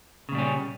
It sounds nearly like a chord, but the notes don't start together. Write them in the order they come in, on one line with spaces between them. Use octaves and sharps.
C#3 A#2 G3 C#4